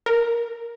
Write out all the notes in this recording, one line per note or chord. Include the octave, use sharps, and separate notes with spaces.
A#4